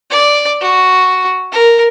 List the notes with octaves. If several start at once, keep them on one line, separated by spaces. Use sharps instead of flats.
D5
F#4
A#4